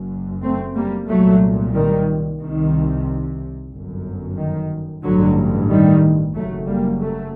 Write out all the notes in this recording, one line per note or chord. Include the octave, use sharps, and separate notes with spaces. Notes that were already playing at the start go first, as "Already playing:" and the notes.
Already playing: F#1 F#2
A3 C4
G3 A#3
C2 A#2 F#3 A3
D#3 G3
C2 C3 D#3
G1 F#2
D#3
A1 G2 D3 F#3
D#3 G3
F#1 F#2 F#3 A3
G3 A#3
F#3 A3